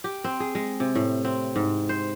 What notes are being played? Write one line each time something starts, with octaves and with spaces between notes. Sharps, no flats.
G4
C4
G#4
G#3
C3
A2
C4
G#2
C5